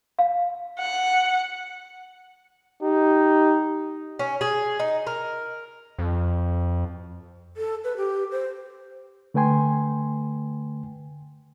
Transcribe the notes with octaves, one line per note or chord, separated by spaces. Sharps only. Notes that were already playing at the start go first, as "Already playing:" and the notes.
F5
F#5
D#4 G4
C#4
G#4
D#4
A#4
F2
A4
B4
G4
C5
D3 A3 B4 G5 G#5 C6